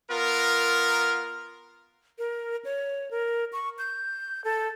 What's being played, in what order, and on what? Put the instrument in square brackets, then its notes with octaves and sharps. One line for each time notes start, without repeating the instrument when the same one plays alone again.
[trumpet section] B3 F4 A#4
[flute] A#4
C#5
A#4
C#6
G6
A4